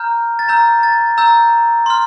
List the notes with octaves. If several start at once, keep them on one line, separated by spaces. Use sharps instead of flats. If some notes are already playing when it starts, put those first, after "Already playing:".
Already playing: A#5 F6 G6
A6
A#5 E6 G6
A6
A#5 E6 G6
C6 F6